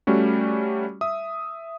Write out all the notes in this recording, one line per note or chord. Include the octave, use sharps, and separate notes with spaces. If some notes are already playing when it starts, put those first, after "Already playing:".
G3 A3 C#4 F#4
E5 D#6